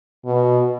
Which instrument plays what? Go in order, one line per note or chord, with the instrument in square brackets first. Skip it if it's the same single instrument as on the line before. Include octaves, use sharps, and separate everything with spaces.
[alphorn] B2